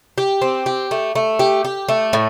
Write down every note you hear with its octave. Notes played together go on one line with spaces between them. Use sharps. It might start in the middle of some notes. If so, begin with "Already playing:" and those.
G4
C4
G4
A3
A3
G4
G4
A3
A2